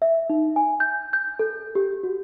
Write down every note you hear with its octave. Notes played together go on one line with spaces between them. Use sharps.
E5
D#4
G#5
G6
G6
A4
G4
F#4